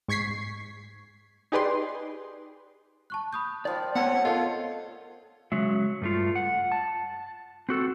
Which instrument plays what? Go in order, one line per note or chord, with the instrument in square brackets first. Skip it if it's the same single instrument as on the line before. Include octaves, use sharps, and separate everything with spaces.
[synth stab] G#2 C#6 G#6 B6 C7
D#4 G4 G#4 B4 D5 C6
[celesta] A5 C#6 F#6
B5 D#6 G6
[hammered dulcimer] D#3 F3 [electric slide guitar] D5
[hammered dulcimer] A3 C4 [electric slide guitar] B3 C#5 [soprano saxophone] F#5
[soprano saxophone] F4 [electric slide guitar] A4 [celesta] A#4 D#5 A5 [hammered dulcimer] C#5 F5
[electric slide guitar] C#3 F#3 G#3 E5
G2 A3 F4
F#5
A5
C4 F#4 A4